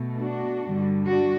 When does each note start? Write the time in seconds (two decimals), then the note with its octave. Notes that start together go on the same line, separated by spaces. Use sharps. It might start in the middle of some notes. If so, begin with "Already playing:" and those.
Already playing: B2 A3
0.19 D4 F#4
0.64 G2 D3 G3
1.08 D4 F#4